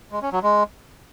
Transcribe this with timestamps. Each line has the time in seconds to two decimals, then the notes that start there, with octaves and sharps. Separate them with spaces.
0.12 G#3
0.22 C#4
0.32 F#3
0.43 G#3